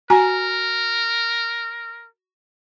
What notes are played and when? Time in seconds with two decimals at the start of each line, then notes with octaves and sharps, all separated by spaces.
0.10 F#4 A#4 G#5 A#5